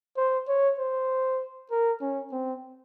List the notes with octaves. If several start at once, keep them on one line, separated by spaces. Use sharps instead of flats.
C5
C#5
C5
A#4
C#4
C4